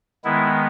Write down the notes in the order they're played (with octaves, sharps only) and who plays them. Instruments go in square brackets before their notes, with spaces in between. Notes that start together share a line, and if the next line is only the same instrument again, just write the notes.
[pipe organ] D#3 G#3 B3 E4